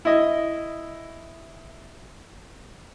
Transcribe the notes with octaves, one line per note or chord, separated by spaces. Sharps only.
E4 D#5